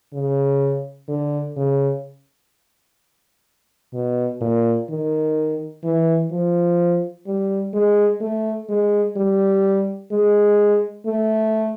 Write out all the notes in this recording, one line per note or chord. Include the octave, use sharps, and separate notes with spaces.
C#3
D3
C#3
B2
A#2
D#3
E3
F3
G3
G#3
A3
G#3
G3
G#3
A3